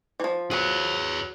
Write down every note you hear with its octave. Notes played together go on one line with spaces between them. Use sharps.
E3 F3
F#3 G#4 B4